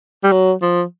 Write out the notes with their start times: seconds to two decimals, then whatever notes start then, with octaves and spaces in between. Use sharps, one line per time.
0.24 G3
0.32 F#3
0.62 F3